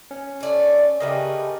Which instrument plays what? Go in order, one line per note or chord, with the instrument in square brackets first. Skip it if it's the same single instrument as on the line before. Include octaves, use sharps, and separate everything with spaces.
[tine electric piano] C#4
[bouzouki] A3 D5
[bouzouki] C#3 A3 B4 [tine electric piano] G4 A#4 D#5